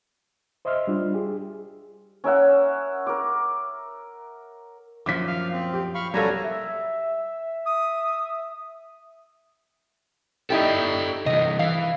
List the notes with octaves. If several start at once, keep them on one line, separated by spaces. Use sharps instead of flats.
C5 D#5 E5 C6 E6 F6
G3 D4 F4
G4 G#4
C#4 A#4 E5 F#5
A#4 D6
F#2 A#2 F3 D6 B6
F5
C4
G4
F5 B5 C#6
B2 F#3 G3 A#3 C#4 A4 G#5 A#5
E5
D#6
D#4 E4 G4 A4 D5 G5
C3 E3 D#5
E3 F5